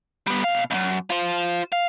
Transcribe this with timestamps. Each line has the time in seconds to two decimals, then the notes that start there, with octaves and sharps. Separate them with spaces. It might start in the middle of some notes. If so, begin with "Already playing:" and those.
0.27 G3 B3
0.44 B2 F5
0.71 C#2 F#2
1.10 F4 C5
1.72 F5